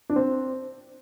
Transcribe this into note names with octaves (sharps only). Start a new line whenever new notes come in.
D4
C4